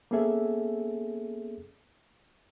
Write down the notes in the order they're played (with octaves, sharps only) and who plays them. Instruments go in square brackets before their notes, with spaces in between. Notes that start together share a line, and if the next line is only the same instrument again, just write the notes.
[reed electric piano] A#3 B3 C#4 G#4 A4 E5